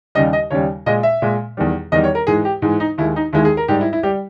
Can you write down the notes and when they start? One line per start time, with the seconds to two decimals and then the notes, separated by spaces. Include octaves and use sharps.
0.15 D#2 C#3 G3 D#5
0.33 D#5
0.50 D#2 C#3 G3 C#5
0.86 A#2 G#3 D#5
1.03 E5
1.22 A#2 G#3
1.57 E2 D#3 G3
1.92 E2 D#3 G3 D#5
2.04 C#5
2.15 A#4
2.27 G#2 E3 G#3 G#4
2.45 G4
2.62 G#2 E3 G#3
2.80 D#4
2.98 D#2 D#3 G#3 E4
3.16 D#4
3.33 D#2 D#3 G#3 E4
3.45 G#4
3.57 A#4
3.68 G#2 G3 G4
3.81 E4
3.93 E4
4.03 G3 G4